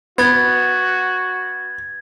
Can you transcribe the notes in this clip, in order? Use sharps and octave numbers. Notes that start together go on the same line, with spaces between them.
B3 F#4 G#6 A6